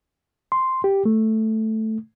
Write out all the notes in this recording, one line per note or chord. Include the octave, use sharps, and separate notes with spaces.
C6
G4
A3